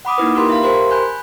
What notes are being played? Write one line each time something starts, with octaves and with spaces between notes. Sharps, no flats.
F#5 B5 D6 D#6
A#3 D#4 E4 B4
F4 G4 A#4 B5 C6
E5 F5
G4 A#4 C5 C6
G#5 B5 F#6 G6